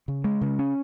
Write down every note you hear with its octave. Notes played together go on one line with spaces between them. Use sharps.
C#3
G#3
C#3
C#4